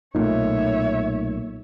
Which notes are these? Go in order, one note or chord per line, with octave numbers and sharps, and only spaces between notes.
B1 A#2 A3 D#4 C#5 E5